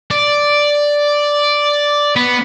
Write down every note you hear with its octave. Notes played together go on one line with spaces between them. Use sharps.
D5
B3